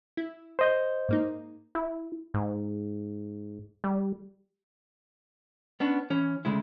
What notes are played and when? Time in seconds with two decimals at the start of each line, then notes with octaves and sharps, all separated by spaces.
0.17 E4
0.59 C5 D#5 G6
1.09 G#2 A#3 D#4
1.75 E4
2.34 G#2
3.84 G3
5.80 B3 C#4 D4
6.10 E3 C#4
6.45 D2 C#3 G#3 E4